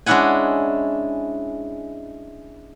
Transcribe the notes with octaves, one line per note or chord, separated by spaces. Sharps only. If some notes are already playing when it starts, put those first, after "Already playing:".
G#3 C#4 D4 E4 F#5 G#5